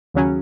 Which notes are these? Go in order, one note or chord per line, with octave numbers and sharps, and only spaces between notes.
D#2 C#3 F#3 C#4